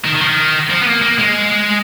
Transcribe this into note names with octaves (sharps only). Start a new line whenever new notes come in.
D#3
D#3
F3
D#3
F3
B3
A#3
A#3
G#3